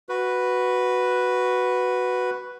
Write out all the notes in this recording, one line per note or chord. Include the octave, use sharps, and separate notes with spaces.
F#4 B4